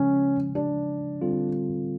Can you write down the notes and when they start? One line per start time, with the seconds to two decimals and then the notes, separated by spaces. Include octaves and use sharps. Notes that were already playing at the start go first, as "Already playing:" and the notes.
Already playing: C#3 F3 G#3 C#4
0.55 D4
1.22 D3 G3 C4 F4 A4